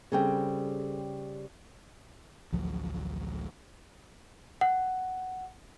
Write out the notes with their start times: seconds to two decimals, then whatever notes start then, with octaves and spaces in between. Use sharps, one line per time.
0.12 C#3 G3 C4 G#4 A4 G5
2.52 A1 D2 F3 F#3
4.61 F#5